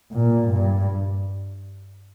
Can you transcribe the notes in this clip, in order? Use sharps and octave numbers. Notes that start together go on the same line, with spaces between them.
A#2
G2